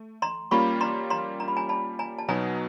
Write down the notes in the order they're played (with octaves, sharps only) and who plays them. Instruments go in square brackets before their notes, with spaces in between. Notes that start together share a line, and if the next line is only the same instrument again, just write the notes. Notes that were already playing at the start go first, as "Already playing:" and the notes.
Already playing: [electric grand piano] A3
[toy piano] A#5 C6
[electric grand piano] G3 A#3 C#4 F4 [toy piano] B5 C#6
[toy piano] A#5 C6
A#5 C6
A#5
B5
G#5 A#5
A5 B5
G#5 A#5
A5
[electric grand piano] B2 F#3 B3 D#4 [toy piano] G#5 A#5